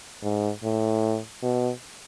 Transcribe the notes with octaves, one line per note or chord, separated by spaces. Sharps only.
G#2
A2
B2